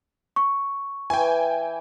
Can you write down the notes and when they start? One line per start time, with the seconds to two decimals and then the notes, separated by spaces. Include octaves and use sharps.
0.36 C#6
1.10 E3 G5 G#5